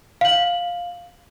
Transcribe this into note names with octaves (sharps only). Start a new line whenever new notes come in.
F5 F#7